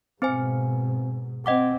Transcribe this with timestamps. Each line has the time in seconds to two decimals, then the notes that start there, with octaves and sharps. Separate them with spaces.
0.22 G#2 B2 C4 C5 G#5
1.46 C4 D#5 F#5 D6